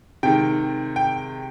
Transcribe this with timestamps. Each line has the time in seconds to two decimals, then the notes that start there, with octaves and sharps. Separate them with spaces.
0.23 C3 D#3 G#3 G5
0.96 G5